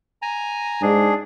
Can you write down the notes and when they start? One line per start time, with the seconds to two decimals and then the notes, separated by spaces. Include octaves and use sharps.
0.22 G#5 A#5
0.82 G#2 D4 G#4